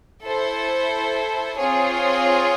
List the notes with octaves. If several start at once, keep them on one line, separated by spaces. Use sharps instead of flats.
E4 A4 C5
C4 F4 G#4 C#5